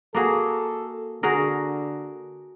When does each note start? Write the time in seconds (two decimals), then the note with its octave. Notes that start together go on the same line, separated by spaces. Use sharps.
0.15 A#3 F#4 G#4 A4
1.23 D3 F#4 G#4 A#4